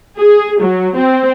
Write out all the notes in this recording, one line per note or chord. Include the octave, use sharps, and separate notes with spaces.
G#4
F#3
C4